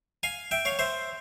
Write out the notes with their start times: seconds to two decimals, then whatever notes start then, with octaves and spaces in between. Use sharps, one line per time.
0.23 F5 G#5
0.51 E5 G5
0.65 C#5 F5
0.79 C5 E5